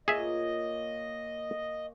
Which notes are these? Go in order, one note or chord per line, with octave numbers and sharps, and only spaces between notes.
A#2 G#4 C#5 D#5 E5 G#5